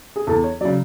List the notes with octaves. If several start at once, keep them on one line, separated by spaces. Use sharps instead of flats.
G#4
E2 A4
C#5
C#3 F#3 D5